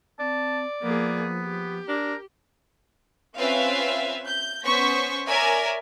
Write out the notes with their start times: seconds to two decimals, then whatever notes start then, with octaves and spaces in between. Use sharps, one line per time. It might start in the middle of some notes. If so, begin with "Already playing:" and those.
0.19 C4 D5 A5
0.83 F3 A#3 B3 G#4
1.41 G4
1.88 D4 A#4
3.36 C4 C#4 F4 B4 E5 F5
4.25 G6
4.64 B3 C#4 C5 C#6 B6
5.27 A#4 C#5 D5 E5 G#5